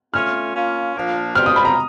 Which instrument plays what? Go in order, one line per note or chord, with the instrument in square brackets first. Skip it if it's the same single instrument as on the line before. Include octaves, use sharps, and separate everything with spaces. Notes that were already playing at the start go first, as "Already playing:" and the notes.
[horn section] A3 C#4 F4 [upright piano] F6
[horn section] A#3 C#4 F4
A#2 F3 A#3 D4
[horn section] B2 G3 C4 F4 [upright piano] F6
[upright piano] D#6
B5
A#5